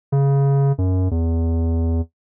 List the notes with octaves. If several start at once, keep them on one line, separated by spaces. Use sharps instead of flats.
C#3
F#2
E2